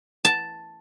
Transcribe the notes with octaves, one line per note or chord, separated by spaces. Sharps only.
A5